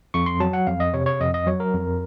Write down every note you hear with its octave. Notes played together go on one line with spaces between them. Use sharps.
F2 C#6
C6
F#3 A5
F#5
F2 F5
D#5
C3 C#5
C#5
F2 D#5
D#5
F#3 C#5
A#4
F2